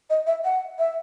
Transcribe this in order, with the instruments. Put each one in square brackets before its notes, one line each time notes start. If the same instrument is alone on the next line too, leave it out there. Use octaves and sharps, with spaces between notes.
[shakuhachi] D#5
E5
F#5
E5